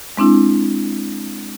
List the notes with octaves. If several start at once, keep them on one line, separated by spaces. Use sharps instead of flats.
G#3 C4 D4 E4